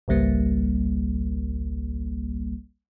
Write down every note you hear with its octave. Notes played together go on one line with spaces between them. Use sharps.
G#1 C#2 G3 A#3